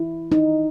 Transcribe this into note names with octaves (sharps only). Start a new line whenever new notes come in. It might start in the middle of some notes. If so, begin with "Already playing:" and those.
Already playing: E4
D#4